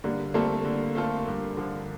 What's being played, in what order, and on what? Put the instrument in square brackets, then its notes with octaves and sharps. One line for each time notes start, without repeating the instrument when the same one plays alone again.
[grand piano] D3 [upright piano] G3 A#3
[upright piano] G3 A#3 [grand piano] A3 C4 F4 A4
[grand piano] D3
A3 C4 F4 A4
G2
D3 F3